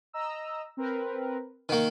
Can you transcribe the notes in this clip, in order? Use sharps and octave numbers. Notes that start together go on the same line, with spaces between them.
D#5 A#5 E6
C4 A#4 B4
D#3 A#3 C#6